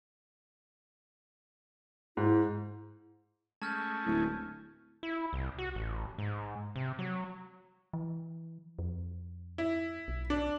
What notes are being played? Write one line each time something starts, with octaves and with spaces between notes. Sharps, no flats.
G#2 E4
G#3 A3 C#4 A5 F6 G6
D1 E4
E4
C2
F#4
A1
G#2
C3
F#3
E3
F2
E4
B1
D4